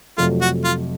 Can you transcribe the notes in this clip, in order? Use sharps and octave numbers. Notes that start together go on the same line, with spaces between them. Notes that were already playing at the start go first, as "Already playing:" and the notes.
F2 C3 F#3 A3 F4
F#4
F4